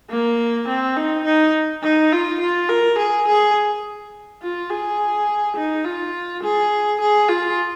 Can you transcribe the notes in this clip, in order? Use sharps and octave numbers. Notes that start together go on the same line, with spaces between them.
A#3
C4
D#4
D#4
D#4
F4
F4
A#4
G#4
G#4
F4
G#4
D#4
F4
G#4
G#4
F4